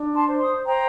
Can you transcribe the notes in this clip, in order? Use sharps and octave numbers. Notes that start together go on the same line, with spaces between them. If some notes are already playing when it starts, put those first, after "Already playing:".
Already playing: D4
A5 C6
C5
C6 D#6
C5 G5 A#5